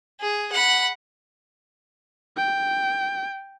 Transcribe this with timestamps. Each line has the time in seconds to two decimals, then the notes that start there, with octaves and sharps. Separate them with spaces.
0.20 G#4
0.52 F#5 B5
2.37 G5